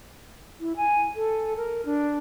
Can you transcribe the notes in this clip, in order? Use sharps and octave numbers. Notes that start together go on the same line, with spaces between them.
E4
G#5
A4
A#4
D4